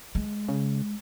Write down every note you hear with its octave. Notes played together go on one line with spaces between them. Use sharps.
G#3
C#3